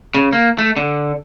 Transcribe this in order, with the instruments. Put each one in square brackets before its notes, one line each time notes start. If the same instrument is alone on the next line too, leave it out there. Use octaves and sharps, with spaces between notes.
[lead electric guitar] C#3
A#3
A3
D3